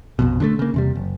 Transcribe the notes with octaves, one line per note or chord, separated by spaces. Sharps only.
A#1 F2 B2
D3 F#3 A3
C#3 A#3
E2 C3 G3
F#1